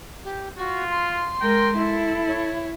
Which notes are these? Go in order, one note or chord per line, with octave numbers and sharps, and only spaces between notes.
G4
F4 F#4
C6
G#3 A#4 G5
E4 A4
C#5